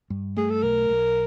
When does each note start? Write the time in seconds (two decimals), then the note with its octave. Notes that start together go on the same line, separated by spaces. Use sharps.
0.10 G2
0.37 A3 G#4
0.50 A4
0.63 B1 A#4
0.89 B1